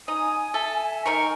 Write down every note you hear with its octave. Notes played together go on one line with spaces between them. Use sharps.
D#4 G#5 D#6
A4 E5
D#3 D#4 A#4 C#6